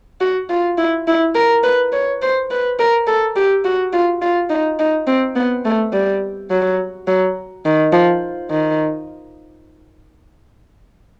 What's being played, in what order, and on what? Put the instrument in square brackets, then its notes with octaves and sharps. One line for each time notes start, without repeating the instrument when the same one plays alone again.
[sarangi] F#4
F4
E4
E4
A#4
B4
C#5
C5
B4
A#4
A4
G4
F#4
F4
F4
D#4
D#4
C4
B3
A3
G3
F#3
F#3
D#3
F3
D#3